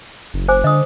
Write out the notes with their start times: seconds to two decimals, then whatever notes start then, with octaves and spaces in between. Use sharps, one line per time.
0.34 F#1
0.48 C5 G#5 D6
0.64 D3 D#5 D#6